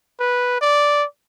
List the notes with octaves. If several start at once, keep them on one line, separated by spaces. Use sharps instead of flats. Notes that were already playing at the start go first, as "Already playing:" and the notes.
B4
D5